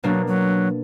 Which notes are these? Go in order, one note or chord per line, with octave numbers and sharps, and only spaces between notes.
B2 F#3 A#3 D4
F#3